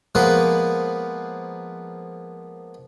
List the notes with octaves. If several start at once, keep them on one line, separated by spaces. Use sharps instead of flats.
F3 G#3 A#3 B3 B4